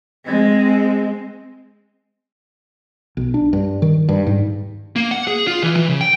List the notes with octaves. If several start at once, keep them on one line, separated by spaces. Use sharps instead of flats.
G#3 C4
B1
D4
G2
D#3
G2
G#2
A#3
F#5
G#4
F4
E3
E3
C#3
G5